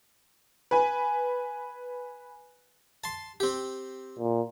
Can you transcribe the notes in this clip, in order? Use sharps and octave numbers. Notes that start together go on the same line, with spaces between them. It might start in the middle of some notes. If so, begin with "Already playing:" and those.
B4 G#5
A5 C6
C4 G4
A#2